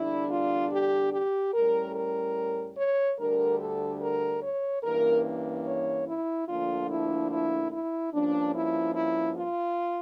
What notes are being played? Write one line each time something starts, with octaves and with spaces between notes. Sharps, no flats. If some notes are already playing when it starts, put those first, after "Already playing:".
Already playing: E2 D3 G3 D4 E4
F4
G4
G4
A2 G3 C#4 A#4
A#4
C#5
D2 D3 G3 A#4
A4
A#4
C#5
G2 E3 A#3 C#4 A#4
C#5
E4
D2 D3 F3 A#3 D4 F4
E4
E4
E4
G2 F3 A#3 C#4 D4
E4
E4
F4